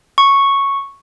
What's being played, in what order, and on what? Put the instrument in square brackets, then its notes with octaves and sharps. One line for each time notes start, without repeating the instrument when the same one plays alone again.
[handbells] C#6